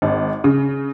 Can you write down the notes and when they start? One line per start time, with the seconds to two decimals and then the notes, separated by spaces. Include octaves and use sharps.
0.02 G#1
0.44 C#3